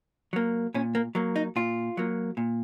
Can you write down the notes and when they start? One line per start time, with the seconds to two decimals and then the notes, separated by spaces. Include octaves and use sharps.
0.33 F#3 A#3
0.74 A#2 C#4
0.95 A#3
1.15 F#3 A#3
1.36 D#4
1.56 A#2 F4
1.97 F#3 A#3
2.37 A#2